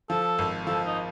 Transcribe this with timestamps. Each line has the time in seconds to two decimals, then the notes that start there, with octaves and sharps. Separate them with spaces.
0.10 F3 A4
0.38 G#1
0.66 F3 A4
0.86 D#4